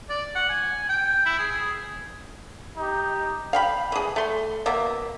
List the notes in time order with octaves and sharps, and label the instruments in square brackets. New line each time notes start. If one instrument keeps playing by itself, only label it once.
[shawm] D5
F#5
G#5
G5
E4
G#4
G#4
[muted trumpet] D#4 [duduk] G4
[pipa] F5 G5 B5
E3 G#4
A3 C6
B2 A#3 E5